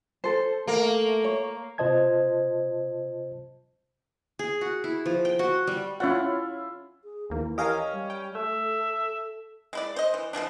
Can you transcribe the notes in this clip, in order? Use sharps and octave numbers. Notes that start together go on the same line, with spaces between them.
A4 C5
A3 A#3 A#4
C#5
C3 F4 C5 D#5 A5 G#6
G#4
F#4
E4
F3
G5
F#4
G3
C#4 E4 F4 C#5 F#5
G#4
D#2 E3 A#3
C#4 G4 A#4 D#5 F5 G#5
G3
G5
A3 A4 E5
G#3 E4 D5
C5 D#5
E3
E3 F3 G#3 D4